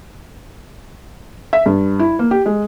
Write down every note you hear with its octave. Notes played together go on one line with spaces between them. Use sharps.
E5
G2
E4
A#3
G4
G#3